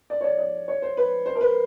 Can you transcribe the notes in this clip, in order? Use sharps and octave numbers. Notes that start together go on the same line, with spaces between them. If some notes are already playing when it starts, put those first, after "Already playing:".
D5
C#5
D5
D5
C#5
C5
B4
C5
A#4
B4